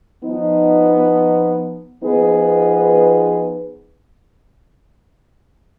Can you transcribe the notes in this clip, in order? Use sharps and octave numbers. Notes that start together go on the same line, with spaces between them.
F3 B3 D#4
F3 B3 D#4 G#4 B4